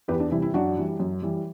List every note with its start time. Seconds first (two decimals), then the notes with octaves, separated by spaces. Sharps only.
0.08 E2 G4 B4
0.20 D4
0.31 C3 E3 G3 E4
0.42 E4
0.54 F#2 D4 F#4
0.77 E3 G3
1.00 F#2
1.22 E3 G3